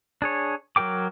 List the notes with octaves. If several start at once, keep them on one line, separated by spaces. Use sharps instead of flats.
D4 G#4 C#5
F#3 G#4 A#4 G5 D6